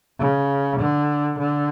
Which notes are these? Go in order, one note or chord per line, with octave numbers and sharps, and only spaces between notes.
C#3
D3
D3